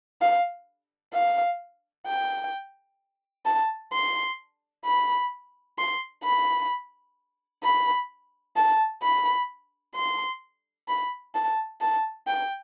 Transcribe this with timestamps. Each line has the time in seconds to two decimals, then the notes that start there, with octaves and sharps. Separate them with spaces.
0.21 F5
1.14 F5
2.06 G5
3.45 A5
3.93 C6
4.85 B5
5.78 C6
6.24 B5
7.63 B5
8.56 A5
9.03 B5
9.95 C6
10.88 B5
11.35 A5
11.81 A5
12.27 G5